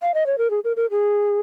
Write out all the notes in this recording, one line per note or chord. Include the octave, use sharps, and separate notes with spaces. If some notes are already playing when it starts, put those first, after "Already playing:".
F5
D#5
C#5
A#4
G#4
A#4
A#4
G#4